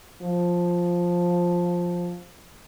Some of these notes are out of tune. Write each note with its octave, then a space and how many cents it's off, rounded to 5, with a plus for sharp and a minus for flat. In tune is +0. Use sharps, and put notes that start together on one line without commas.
F3 +5